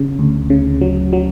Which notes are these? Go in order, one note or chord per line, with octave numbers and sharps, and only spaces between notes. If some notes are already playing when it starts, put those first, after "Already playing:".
Already playing: C#3
D2
C#3
F#3
F#3